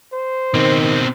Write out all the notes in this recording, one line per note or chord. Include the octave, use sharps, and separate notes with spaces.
C5
B2 D#3 C4